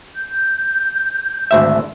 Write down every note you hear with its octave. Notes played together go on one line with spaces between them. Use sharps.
G6
G#1 D2 E5